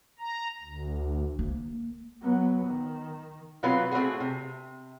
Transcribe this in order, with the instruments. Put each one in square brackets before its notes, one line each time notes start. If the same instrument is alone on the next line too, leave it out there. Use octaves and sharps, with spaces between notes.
[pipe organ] A#5
D2
[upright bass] A#3
[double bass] F#3 B3
D#3
[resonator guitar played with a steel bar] B2 F#3 C4 F4 B4
A3 C4 C#4 E4 F#4 G#4
C3